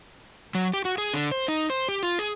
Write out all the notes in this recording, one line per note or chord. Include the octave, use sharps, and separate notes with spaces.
F#3
G4
F#4
G#4
D3
C5
D#4
C5
G4
F4
G#4